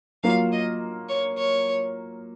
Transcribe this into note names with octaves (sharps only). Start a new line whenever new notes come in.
F#3 A#3 F4 F5
D#5
C#5
C#5